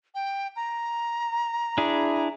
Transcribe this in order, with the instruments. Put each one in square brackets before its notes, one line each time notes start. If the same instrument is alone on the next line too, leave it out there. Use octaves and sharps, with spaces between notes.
[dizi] G5
A#5
[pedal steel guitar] D4 E4 G#4